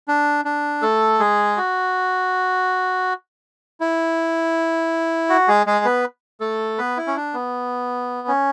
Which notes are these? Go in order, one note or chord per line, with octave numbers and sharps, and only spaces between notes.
D4
D4
A3 A4
G#3 G#4
F#4
E4
F#4
G#3 G#4
G#3 G#4
B3 B4
A3 A4
B3 B4
E4
C#4
D4
B3
C#4